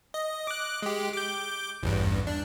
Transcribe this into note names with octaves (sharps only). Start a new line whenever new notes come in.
D#5
D6 F#6
G#3 G4
D6 G6
A1 E2 G2
D4